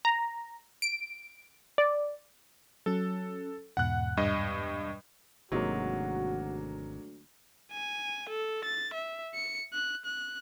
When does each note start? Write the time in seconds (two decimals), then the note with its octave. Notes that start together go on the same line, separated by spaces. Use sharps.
0.05 A#5
0.82 D7
1.78 D5
2.86 F#3 C#4 A4
3.77 E2 G#2 B2 F#5 F#6
4.17 G2 D#5
5.52 G#1 D2 C3 D#3 F#3 G#3 A#3 F#4
7.72 G#5
8.29 A4
8.64 A6
8.94 E5
9.35 C#7
9.73 F#6
10.05 F#6